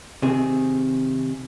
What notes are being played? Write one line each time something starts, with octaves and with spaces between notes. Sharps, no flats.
C3 D#3 C4 G#4